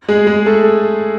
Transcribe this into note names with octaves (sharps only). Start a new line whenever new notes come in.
G#3 G#4
G#3 G#4
A3 A4